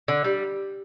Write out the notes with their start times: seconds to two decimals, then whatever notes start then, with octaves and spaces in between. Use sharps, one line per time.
0.08 D3
0.24 G3